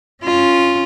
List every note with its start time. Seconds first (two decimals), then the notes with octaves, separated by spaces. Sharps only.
0.23 C#4 F4